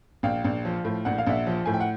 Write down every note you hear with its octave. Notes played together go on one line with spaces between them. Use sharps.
A#1 F5 G5
A#1
F3
A2
A#1 F#5
F5
A#1 E5 F#5
F3
A2 G#5
G5
F#5